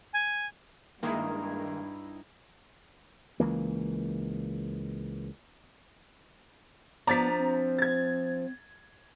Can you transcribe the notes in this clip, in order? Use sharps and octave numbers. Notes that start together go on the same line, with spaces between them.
G#5
G2 D#3 G#3 A#3 D#4 E4
C#2 E3 A#3
F3 B3 D4 A#5 A6 B6
C4
G#6 A6